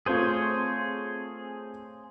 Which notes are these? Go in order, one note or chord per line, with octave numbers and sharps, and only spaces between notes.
A3 C4 F4 G#4 C5 C#5